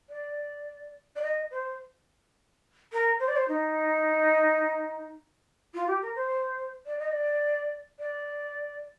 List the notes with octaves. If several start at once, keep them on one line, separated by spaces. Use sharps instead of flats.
D5
D5
D#5
C5
A#4
C5
D5
C5
D#4
F4
G4
A#4
C5
D5
D#5
D5
D5